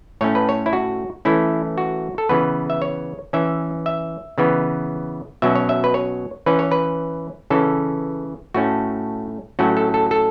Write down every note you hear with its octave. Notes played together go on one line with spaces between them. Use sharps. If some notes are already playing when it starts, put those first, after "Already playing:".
A2 A3 C#4 C#5
B4
C#5
E4
F#4
E3 A3 C#4 E4
F#4
A4
C#3 E3 B3 B4
E5
C#5
E3 C#4 E5
E5
C#3 E3 B3
B2 F#3 C#4 E5
C#5
E5
B4
C#5
E3 C#4 B4
C#5
B4
C#3 E3 C#4 A4
A2 A3 C#4 F#4
A2 F#3 A3 C#4 F#4
A4
A4
A4